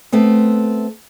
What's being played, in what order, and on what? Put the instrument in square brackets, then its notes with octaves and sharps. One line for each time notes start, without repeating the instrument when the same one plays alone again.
[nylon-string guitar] A3 B3 C4